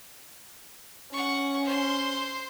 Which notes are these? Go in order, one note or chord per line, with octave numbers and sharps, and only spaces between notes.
C#4 F#5 C#6
C5 C6